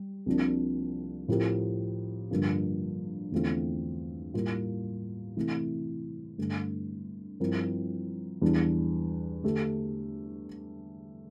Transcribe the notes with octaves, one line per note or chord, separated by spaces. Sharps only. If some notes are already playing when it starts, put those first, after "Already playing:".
Already playing: G3
C2 C3 F3 A#3 D4
A2 F3 C4 G4 A#4
G2 D3 F3 A#3 D4
E2 D3 A3 C4 F4
A2 G3 A#3 F4
C3 E3 A3 E4
G2 D3 A3
G2 F3 C4 E4 A#4
E2 E3 G3 D4
D3 A3 D4 G4